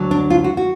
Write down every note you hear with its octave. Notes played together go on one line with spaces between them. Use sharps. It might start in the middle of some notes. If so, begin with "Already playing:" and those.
Already playing: D2 D3 F#3
D4
F4
F#4
F#4